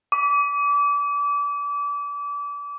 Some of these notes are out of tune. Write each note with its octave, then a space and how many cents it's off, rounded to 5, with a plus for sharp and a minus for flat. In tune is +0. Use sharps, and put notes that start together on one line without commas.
D6 -30